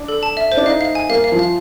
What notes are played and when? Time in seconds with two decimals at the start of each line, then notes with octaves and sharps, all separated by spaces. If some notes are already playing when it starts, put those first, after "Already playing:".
Already playing: D4
0.08 A4
0.23 A5
0.37 E5
0.52 C5
0.57 D4
0.66 D#4 F5
0.81 F5
0.95 G#5
1.09 A#3 F5
1.24 F5
1.32 F3
1.39 F5